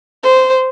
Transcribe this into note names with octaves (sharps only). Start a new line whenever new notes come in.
C5